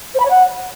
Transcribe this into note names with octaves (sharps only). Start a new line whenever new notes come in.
C5
B5
C#5
F#5